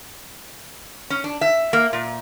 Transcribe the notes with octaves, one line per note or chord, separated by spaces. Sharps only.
C#4
D4
E5
A#3
A#2